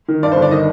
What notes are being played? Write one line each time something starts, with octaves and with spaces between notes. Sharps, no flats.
D#3
G2 D5
C5
G1
D5
D#3 D#5